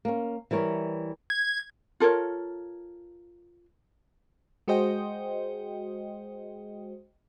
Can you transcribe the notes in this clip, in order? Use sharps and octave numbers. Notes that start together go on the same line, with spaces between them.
A#3 C#4
E3 G3 A#4 C#5
G#6
F4 A4 A#4 C#5
G#3 F#4 G#4 C5 D#5 G5